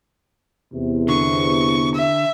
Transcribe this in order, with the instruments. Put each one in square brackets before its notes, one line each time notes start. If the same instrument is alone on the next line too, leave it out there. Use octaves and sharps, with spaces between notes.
[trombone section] E2 C3
[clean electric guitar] D3 [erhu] C#6
[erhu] E5